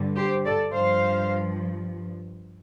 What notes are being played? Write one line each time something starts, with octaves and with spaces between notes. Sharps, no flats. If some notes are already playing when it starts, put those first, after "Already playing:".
Already playing: G2 D3 G3
G4 C5
A4 D5
G2 F3 C5 F5